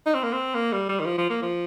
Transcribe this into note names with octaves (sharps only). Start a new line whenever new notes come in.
D#4
C4
A#3
C4
A#3
G3
G3
D#3
F3
F3
A#3
F3